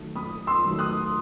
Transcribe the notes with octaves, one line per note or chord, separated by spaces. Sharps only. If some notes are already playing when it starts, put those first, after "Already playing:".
Already playing: F#2 D#3 F#3 A3
F#2 B5 D#6
C6 E6
D#3 F#3 A3
D#6 F#6